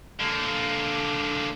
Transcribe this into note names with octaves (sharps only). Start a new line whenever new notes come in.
D3 A#3